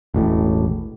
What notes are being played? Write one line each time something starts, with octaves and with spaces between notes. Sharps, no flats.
E1 A1 A2